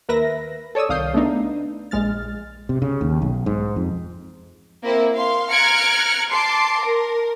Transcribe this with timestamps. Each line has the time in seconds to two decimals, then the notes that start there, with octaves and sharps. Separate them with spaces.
0.09 D#2 A#4 B4 E5 A#6
0.75 A4 C#5 D5 D#6 E6
0.89 C2 D#3 F5 D#6 G6 C7
1.13 C#3 A3 B3 D4 D#4
1.91 A#1 G#3 F6 A6
2.69 C3
2.82 C#3
3.01 D#2
3.22 B1
3.46 G#2
3.76 F2
4.83 A#3 C4 E4
5.14 F5 C6
5.50 A#5 F6 F#6 G#6 C#7 D7
6.31 A5 C6 D6 C7
6.81 A#4